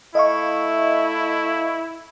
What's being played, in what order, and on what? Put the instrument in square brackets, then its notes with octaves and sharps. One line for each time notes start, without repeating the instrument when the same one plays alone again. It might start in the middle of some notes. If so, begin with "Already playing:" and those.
[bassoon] A3 [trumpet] E4 [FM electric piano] D#5 F5 C#6